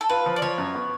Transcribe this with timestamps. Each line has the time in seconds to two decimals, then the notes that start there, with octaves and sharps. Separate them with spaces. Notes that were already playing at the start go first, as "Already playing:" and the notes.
0.01 A4
0.09 F4 B4
0.26 F3
0.36 D5
0.42 F3 C#5
0.58 F#2
0.75 B3